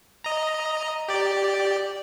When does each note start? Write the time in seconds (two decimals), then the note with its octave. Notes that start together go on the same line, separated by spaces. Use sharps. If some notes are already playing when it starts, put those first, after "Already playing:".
0.24 D#5 A#5
1.08 G4 D5